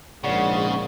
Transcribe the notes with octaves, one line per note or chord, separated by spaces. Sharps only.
A#1 G#2 C#3 D5 F#5